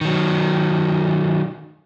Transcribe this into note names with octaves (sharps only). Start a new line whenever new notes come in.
D#3 F#3